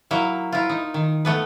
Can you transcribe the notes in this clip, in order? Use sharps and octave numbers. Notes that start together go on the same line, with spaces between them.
F#3 A#3 E4
E4 F4
D#4
D#3
A3 B3 B4